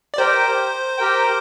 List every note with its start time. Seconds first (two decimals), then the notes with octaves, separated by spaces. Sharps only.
0.14 D5
0.18 G4 A#4 C5 G5
0.98 G4 A#4 G5